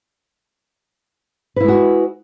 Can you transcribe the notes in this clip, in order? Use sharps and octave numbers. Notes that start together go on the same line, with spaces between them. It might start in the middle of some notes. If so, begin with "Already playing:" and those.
G#3 E4 F#4 B4